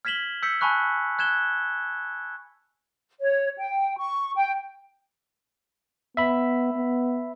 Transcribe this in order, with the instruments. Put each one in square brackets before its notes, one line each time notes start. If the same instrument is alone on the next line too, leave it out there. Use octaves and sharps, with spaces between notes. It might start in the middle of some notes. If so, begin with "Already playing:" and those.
[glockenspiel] F6 G#6 B6 E7 F#7 G7
E6 G6 B6 C#7
G#5 A5 B5 C#6 F#6
F#6 G#6 E7 G7
[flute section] C#5
G5
C#6
G5
[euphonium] B3 [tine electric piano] E5 B5
[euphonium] B3